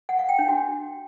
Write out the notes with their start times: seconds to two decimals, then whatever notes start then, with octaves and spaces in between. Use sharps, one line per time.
0.09 F#5
0.19 F5
0.29 G5
0.39 D4
0.49 F#4